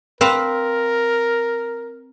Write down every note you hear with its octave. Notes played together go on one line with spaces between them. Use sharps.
C4 A#4 B4 F5